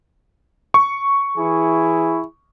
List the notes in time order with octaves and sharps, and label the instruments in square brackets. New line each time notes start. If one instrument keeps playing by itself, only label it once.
[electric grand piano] C#6
[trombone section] E3 E4 G#4